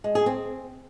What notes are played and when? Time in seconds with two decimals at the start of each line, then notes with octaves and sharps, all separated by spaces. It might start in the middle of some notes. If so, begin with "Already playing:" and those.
0.04 G#3
0.15 G#4
0.26 C4